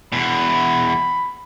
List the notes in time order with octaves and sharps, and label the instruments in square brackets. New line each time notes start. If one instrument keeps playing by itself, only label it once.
[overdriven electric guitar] E2 B2 [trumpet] B5